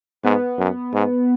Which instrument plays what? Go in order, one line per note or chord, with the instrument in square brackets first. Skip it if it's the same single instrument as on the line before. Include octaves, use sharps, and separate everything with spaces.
[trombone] G#2 [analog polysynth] B3
[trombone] F#2
G#2